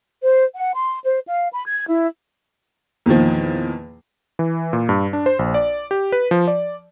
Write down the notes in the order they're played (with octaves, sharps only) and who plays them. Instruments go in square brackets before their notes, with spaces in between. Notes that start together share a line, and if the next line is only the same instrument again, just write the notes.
[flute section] C5
F#5
C6
C5
F5
B5
G#6
E4
[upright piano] E2 A#2 D#3 F3
[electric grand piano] E3
A#2
G2
D4
C5
A#1
D5
G4
B4
F3
D5